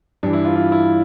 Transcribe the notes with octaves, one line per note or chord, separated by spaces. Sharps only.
G2 E3 D4
E4
F4
F4
E4